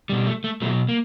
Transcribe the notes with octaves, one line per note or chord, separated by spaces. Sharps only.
B2 G3
A3
A3
B2 F#3 A3
A#3